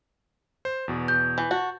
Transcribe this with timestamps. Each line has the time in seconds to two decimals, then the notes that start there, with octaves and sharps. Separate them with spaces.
0.65 C5
0.88 E2 B2
1.08 G6
1.38 E3
1.51 F#4 A5